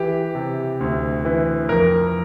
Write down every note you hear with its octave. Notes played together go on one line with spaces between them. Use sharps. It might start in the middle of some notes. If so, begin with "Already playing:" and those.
Already playing: E3 G4
C3
D2
E3
F2 A#4